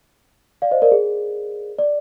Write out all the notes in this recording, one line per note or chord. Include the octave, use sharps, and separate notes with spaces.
D5 F5
C5 D#5
A#4 D5
G#4
D5